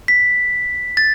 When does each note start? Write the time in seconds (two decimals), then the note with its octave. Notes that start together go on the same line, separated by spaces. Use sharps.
0.08 B6
0.97 A6